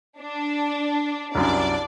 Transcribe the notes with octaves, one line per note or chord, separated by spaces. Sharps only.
D4
C2 F#2 D4 D5